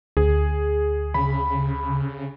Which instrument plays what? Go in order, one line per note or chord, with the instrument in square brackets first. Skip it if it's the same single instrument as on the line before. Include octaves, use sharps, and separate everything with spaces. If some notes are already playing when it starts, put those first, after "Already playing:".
[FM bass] D2 [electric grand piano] G#4
[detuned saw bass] C#3 [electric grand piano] B5